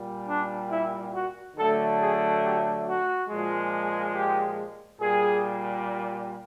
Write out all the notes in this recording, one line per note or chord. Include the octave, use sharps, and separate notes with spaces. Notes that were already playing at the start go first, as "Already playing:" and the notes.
Already playing: A#2 G3
D4
E4
F#4
D3 F#3 A3 A4
G#4
G4
F#4
A#2 F3 G#3
G4
A#2 G3 G#4